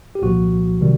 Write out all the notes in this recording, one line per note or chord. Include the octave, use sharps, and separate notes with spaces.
G4
C2 A#2 F3 F#4
C3 D#3 G3